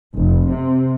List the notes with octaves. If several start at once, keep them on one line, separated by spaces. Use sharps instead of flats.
F1
C3